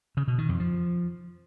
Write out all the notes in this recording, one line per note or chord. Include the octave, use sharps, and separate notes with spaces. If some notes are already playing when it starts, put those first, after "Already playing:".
C#3
B2
D#3
F2
F3